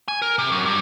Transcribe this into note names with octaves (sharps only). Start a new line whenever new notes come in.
G#5
A#4
C3
F#2
G2